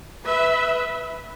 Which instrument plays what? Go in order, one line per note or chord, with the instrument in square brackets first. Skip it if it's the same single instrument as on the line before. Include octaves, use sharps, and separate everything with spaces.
[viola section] B4 E5